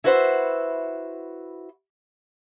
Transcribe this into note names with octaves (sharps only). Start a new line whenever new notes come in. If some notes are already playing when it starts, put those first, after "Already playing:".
E4 F#4 B4 C5 E5 F#5